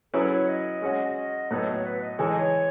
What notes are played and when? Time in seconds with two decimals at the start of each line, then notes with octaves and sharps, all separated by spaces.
0.14 F#3 C#4 E4 G#4 A4 B4
0.31 C#5
0.48 D#5
0.82 G#3 C#4 F#4
1.16 D#5
1.51 A2 F#3 B3 D#4 A4 C#5
1.84 B4
2.01 D#5
2.19 E3 G#3 D#4 A4 C#5
2.28 D#5
2.37 C#5